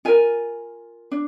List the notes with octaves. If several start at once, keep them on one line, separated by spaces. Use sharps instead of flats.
F4 A#4 G#5
D4